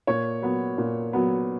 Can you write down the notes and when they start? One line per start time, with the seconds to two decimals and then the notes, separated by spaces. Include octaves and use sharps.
0.07 A#2 C#5
0.42 F#3 B3
0.78 A#2
1.13 F#3 B3